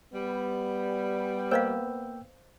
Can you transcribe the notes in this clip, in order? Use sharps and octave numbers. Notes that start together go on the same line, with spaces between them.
G3 B3
A#3 C5 D#5 F5 G5 E6